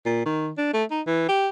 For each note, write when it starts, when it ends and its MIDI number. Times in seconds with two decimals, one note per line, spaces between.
0.06 0.25 46
0.26 0.50 51
0.58 0.69 62
0.73 0.84 57
0.91 1.01 63
1.07 1.29 52
1.29 1.49 67